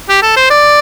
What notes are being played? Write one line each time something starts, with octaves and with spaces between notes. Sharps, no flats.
G4
A4
C5
D5